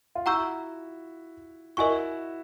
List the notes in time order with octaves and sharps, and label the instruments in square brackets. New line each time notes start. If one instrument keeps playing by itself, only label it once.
[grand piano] F4
[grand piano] E4 F#4 [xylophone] F#5 A#5 C#6 E6 G6
[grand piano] E4 F#4 [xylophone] A#4 D#5 G#5 C#6